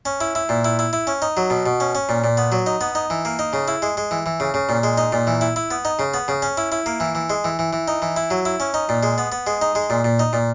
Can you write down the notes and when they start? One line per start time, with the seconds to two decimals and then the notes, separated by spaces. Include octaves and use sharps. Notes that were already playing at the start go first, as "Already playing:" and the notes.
0.06 C#4
0.21 E4
0.35 E4
0.49 A#2
0.65 E4
0.79 E4
0.93 E4
1.07 C#4
1.22 D#4
1.37 F#3
1.50 B2
1.66 B2
1.80 C#4
1.95 C#4
2.09 A#2
2.24 A#2
2.37 B3
2.52 F#3
2.66 D#4
2.81 B3
2.95 D#4
3.10 E3
3.25 A#3
3.39 D#4
3.53 C#3
3.68 E4
3.82 G#3
3.97 G#3
4.11 E3
4.26 E3
4.40 C#3
4.54 C#3
4.69 A#2
4.83 G#3
4.98 D#4
5.12 A#2
5.27 E3
5.41 E4
5.56 E4
5.71 B3
5.85 D#4
5.99 C#3
6.14 B3
6.28 C#3
6.42 C#4
6.58 E4
6.72 E4
6.86 A#3
7.00 E3
7.15 E3
7.30 G#3
7.44 E3
7.59 E3
7.73 E3
7.88 D#4
8.02 E3
8.17 E4
8.31 F#3
8.45 E4
8.60 C#4
8.74 D#4
8.89 A#2
9.03 G#3
9.18 B3
9.32 B3
9.47 G#3
9.62 D#4
9.75 G#3
9.90 A#2
10.05 A#2
10.20 D#4
10.33 A#2